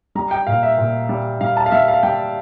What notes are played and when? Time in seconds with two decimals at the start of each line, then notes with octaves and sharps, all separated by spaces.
0.15 G3 A#5
0.31 G5
0.47 A#2 F5
0.63 E5
0.78 A#2
1.09 G3
1.41 G3 F5
1.57 A5
1.66 F5
1.72 G3 E5
1.88 F5
2.03 G3 G5